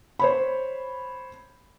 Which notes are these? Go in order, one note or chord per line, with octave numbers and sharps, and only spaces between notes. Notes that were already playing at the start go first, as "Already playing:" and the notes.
C5 C#5 B5